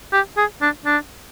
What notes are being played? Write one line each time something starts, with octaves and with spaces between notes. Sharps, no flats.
G4
G#4
D4
D4